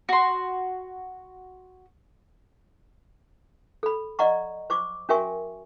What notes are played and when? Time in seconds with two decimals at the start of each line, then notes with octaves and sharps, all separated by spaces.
0.09 F#4 C6
3.83 A4 B5
4.19 D5 D#5 F#5 A#5 C#6
4.70 C5 C#6 D6
5.09 C#4 F#4 A#4 E5 G#5 C#6